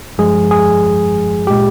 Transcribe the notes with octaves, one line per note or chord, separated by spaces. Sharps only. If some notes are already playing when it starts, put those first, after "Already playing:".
G2 F3 G#3 G#4
G#4
A#2 G#3 G4